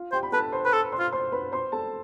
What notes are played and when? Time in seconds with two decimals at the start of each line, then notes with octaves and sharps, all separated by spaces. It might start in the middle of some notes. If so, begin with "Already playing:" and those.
Already playing: F4 F5
0.12 G4 C5 G5
0.23 B5
0.32 A4 B4 A5
0.52 C5 C6
0.66 B4
0.73 A4
0.92 C5 C6
0.99 F4
1.12 C5 C6
1.32 B4 B5
1.52 C5 C6
1.72 A4 A5